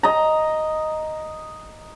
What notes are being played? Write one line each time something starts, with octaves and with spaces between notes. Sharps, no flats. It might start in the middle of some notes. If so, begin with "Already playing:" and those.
D#5 A#5